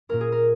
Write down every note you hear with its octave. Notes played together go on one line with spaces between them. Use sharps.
A#2 A#3 C#4 A#4
G#4
A#4